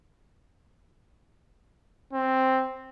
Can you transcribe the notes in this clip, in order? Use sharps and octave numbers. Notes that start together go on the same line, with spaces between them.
C4